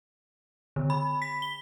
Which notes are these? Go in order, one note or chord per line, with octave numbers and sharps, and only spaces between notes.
D3
B5
B6
G7